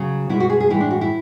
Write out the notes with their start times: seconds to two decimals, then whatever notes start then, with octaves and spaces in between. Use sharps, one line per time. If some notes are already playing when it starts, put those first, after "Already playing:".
Already playing: C#3 F#3
0.29 B2 G#3 E4
0.40 F#4
0.50 G#4
0.60 G#4
0.70 A2 E3 G#3 E4
0.80 D4
0.91 F#4
1.01 E4